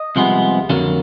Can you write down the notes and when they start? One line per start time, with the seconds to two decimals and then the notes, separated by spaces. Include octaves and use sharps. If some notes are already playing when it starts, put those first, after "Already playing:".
Already playing: D#5
0.16 C2 C3 F3 G#3 B3
0.70 F2 D3 F#3 A#3